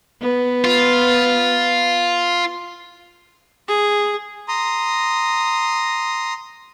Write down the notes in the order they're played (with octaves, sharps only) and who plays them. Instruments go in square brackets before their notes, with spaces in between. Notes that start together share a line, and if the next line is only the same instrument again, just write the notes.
[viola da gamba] B3
[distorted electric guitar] F4
[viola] G#4
[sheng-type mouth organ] A#5 C6 D#6